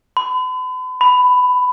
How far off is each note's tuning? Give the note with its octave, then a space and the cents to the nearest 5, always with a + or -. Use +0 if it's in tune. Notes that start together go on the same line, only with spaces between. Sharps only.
B5 +40
B5 +15